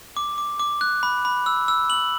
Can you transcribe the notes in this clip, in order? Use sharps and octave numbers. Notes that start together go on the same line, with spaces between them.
D6
D6
D6
F#6
B5
B5
E6
E6
F#7